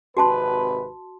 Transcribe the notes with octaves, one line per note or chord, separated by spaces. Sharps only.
G#1 C3 F#4 B4 A5 C6